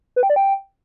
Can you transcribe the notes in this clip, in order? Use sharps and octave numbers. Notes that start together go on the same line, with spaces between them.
B4
G5
D5
G5